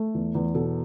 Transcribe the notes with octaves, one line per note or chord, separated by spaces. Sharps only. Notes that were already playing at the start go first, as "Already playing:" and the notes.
Already playing: A3
E2
E2
B2 A4